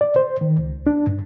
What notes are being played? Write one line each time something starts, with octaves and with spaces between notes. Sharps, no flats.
D5
C5
D#3
C#2
D4
G2